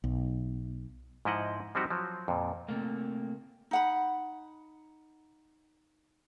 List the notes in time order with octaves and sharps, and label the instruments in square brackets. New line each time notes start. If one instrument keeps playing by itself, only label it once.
[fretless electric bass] B1
[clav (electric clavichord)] G#2 F3 E4 D#5 F#5
F3 G3 C4 D#4 F#4 G4
F3 F#3
F2 A#2
[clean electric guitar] C3 A3 A#3
[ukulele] D#4 F#5 B5